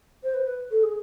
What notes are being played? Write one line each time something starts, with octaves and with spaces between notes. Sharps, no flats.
C5
B4
B4
A4
G#4